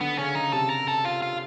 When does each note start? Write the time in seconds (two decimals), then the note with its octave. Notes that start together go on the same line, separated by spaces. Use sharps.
0.01 D3 B3
0.18 C#3 C#4
0.35 C#3 D#4
0.53 C3 A4
0.70 A#4
0.88 A4
1.05 F4
1.22 F4